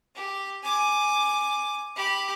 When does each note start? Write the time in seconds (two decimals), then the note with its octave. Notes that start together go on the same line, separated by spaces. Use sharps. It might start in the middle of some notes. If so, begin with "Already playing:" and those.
0.15 G4
0.63 G#5 D6
1.96 G4 B5